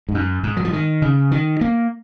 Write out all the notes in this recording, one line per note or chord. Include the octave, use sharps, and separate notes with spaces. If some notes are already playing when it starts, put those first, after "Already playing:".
G#2
F#2
G#2
F#3
F3
D#3
C#3
D#3
A#3